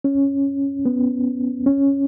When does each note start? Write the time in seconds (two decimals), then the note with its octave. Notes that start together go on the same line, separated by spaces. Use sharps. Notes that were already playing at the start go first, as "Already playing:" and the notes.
0.04 C#4
0.85 B3
1.66 C#4